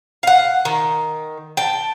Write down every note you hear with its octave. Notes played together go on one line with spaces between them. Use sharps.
F5 F#5
D#3
G5 A5